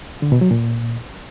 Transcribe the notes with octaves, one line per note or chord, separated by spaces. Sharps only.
D3
B2
F#3
A#2